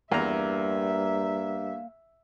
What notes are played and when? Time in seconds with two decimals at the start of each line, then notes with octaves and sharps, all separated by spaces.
0.12 E2 G2 A#3 E5 A#5